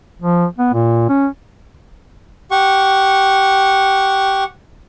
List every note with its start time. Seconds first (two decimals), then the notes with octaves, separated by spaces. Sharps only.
0.22 F3
0.58 B3
0.73 A#2
1.09 C#4
2.51 G4 F#5 C#6